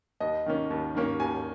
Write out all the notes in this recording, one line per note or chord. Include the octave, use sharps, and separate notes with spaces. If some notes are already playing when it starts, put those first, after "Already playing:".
D#2 D#5
D#3 A#3 C#4
D#2
D#3 A#3 C#4
D#2 G#5